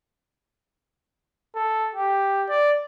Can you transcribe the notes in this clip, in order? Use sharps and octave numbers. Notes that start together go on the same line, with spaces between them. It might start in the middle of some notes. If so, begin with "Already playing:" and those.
A4
G4
D5